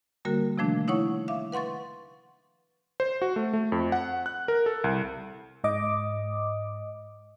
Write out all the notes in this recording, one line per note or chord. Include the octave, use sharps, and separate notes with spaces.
D3 G3 A#3 F#4 A#4
C3 D#3 F3 A3 D4
D#4 E4 C#5 F#5 C#6
E5 F5 D6
B4 F#5 C6 C#6 A6
C5
F#4
A3
A3
F2
F#5
F#6
A#4
A4
C2
G#2 D#5 D6